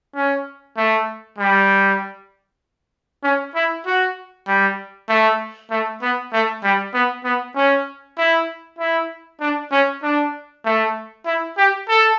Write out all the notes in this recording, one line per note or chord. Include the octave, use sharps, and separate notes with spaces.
C#4
A3
G3
C#4
E4
F#4
G3
A3
A3
B3
A3
G3
B3
B3
C#4
E4
E4
D4
C#4
D4
A3
E4
G4
A4